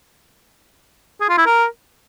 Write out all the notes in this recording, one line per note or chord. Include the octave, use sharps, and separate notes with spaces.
G#4
F4
E4
A#4